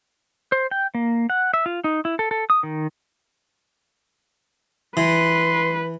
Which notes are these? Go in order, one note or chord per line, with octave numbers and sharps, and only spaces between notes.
C5
G5
A#3
F#5
E5
F4
D#4
E4
A4
A4
D#6
D#3
E3 B4 C6